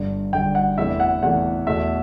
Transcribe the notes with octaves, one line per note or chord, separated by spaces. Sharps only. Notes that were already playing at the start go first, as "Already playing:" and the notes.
Already playing: G1 G2 D3
G1 G2 D3 G5
F#5
E2 C3 E3 A3 E5
F#5
E2 C3 E3 A3 F#5
E2 B2 A3 E5